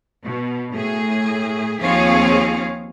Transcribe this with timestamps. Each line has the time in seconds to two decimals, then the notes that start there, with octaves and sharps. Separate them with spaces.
0.23 B2
0.73 A2 G#4
1.81 D#2 F3 C4 G#4 C#5 F5